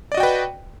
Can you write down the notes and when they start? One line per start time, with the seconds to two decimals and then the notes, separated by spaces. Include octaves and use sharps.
0.12 D5
0.14 D#5
0.17 F#4
0.20 G5
0.23 B4